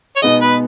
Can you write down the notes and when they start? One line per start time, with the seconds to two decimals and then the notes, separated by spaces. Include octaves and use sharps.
0.16 C#5
0.22 B2 G#3 B3 D#4 G#4 D#5
0.41 B4